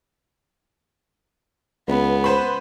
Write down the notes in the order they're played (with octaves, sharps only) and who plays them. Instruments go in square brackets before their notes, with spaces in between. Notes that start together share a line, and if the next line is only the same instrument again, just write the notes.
[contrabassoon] C#2 [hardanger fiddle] B3
[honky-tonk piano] B4 C5 B5